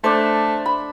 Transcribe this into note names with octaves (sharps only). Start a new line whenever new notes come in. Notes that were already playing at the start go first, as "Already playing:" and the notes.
A3 D4 C5
B5